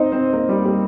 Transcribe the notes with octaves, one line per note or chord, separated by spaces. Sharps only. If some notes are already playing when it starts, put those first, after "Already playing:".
Already playing: C4 D#4 C5 D#5
C4 C5
A#3 A#4
G3 G4
G3 G4